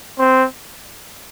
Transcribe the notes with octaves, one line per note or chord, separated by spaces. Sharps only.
C4